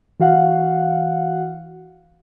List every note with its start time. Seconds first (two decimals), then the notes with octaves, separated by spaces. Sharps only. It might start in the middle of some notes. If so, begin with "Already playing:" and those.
0.20 E3 F#4 F5 F#5